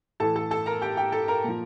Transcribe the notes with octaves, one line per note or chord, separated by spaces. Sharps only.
A2 E3 A4 A5
A4 A5
A4 A5
A#4 A#5
G4 G5
G4 G5
A4 A5
A#4 A#5
A#2 F3